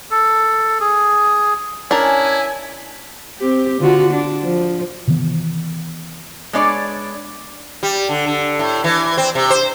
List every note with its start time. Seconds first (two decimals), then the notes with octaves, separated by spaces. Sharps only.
0.11 A4
0.80 G#4
1.91 C#4 D4 E4 A#4 G#5
3.38 C4 G4
3.79 D3 F4 F#4
4.13 D4
4.43 F3
5.07 C3 D#3 E3 B3
6.53 G#3 B3 D4 C#5 D5
7.83 G3
8.09 D3
8.26 D3
8.59 A2
8.84 E3
9.17 C4
9.35 C3
9.50 C5